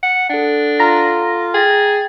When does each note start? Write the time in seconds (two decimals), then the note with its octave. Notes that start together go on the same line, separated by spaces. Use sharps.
0.03 F#5
0.29 D4 A4 F#5
0.79 F4 A#5 A#6
1.54 G#4 G5 A6